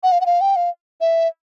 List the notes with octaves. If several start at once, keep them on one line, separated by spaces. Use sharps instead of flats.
F#5
F5
F#5
F5
G5
F5
E5